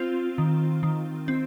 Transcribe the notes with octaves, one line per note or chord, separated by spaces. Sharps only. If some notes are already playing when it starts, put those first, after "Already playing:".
Already playing: C4 F4
D#3
D#3
C4